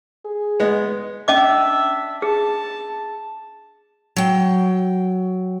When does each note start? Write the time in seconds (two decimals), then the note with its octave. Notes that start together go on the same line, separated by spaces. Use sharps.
0.25 G#4
0.60 G#3 B3
1.28 C#4 D4 D#5 E5 D6
2.22 G#4 A5
4.16 F#3 G5